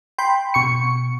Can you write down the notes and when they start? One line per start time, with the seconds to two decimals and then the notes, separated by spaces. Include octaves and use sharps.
0.18 G5 B5 C6
0.54 B2 C#6 C#7